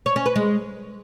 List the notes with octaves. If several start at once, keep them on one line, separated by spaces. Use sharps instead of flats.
C#5
C#4
B4
G#3